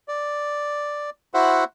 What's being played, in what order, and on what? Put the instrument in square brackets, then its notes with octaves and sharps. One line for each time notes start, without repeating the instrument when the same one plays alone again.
[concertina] D5
E4 F#4 C5 E5 F#5